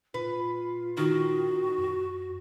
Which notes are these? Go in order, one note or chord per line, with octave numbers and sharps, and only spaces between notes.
A#2 F4 B4
D#3 F#4
F#2